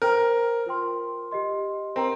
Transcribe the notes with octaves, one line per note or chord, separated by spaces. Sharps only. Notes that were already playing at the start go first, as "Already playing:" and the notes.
A#4 C5 G5 A#5
F4 A#4 G5 C6
G4 D#5 C6
C4 A#4 G5 A#5